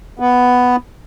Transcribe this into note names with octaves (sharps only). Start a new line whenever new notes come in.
B3